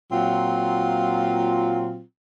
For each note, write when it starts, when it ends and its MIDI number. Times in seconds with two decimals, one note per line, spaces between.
0.12 2.02 46
0.12 2.02 54
0.12 2.02 60
0.12 2.02 65